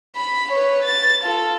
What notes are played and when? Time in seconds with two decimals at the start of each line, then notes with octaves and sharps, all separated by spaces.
0.16 B5
0.52 B4 C#5
0.83 A6
1.24 F4 A4